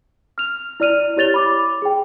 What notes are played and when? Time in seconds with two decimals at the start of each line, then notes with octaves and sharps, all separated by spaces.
0.38 F6 F7
0.80 E4 D5 F6 D#7 F7
1.17 E4 G4 C#5 A6 F7 G7
1.34 B5 D6
1.82 G#4 G5